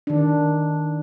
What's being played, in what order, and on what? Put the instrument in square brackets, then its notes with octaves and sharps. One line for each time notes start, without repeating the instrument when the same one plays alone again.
[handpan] D#3 D4